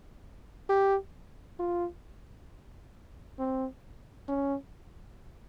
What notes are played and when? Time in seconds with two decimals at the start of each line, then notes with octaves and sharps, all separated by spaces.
0.69 G4
1.59 F4
3.39 C4
4.28 C#4